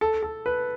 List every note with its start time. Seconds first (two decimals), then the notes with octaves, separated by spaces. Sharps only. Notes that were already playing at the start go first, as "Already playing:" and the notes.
0.01 A4
0.23 A4
0.46 B4